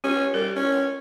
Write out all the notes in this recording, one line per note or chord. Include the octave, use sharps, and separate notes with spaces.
C#4 G4
G3 A#4
C#4